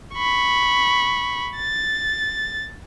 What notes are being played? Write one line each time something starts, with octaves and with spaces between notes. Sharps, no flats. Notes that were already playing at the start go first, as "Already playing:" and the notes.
B5 C#6
A6